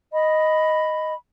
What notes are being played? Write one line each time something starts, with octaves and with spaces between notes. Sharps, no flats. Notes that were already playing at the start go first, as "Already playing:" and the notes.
D#5 B5